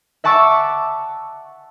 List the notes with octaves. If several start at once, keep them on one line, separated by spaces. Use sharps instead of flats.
E5 F#5 A5 C#6 D6 E6